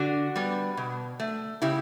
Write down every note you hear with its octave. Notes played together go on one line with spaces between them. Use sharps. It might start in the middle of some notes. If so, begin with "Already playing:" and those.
Already playing: D3 D4 F#4
G3 B3
B2
A3
C#3 E4 G4